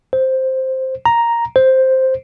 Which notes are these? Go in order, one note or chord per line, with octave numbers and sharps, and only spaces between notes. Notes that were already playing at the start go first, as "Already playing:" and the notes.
C5
A#5
C5